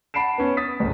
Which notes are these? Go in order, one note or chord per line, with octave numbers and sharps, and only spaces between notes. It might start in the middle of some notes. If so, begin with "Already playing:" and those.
F#5 A5 B5 C7 D7 E7
B3 C#4
D#6 A6 B6
G1 C#2